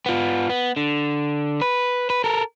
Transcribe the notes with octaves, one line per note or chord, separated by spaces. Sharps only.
B3 F4
B3
D3
B4
B4
A4 A#4